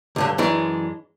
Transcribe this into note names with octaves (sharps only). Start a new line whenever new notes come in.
C#2 G2 D3
F#2 E3 G#3 D4